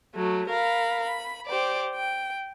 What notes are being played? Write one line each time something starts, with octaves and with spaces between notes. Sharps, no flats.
F#3 A3
A#4 F5 B5
B5
G4 C5 D5
G5